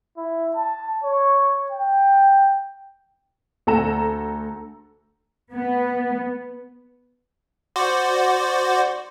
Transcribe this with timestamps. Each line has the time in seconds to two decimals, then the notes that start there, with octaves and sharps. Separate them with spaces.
0.18 E4
0.57 A5
1.04 C#5
1.72 G5
3.67 D2 A4 A#5 E7
5.53 B3
7.76 F#4 C5 D5